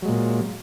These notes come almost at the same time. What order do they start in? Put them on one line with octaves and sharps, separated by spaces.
F#3 G#3 A#2